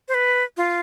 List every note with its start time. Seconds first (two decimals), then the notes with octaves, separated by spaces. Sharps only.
0.08 C5
0.14 B4
0.57 F4